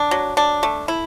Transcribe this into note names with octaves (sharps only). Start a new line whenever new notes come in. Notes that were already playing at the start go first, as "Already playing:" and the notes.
Already playing: D4
F#3
D4
A3
E4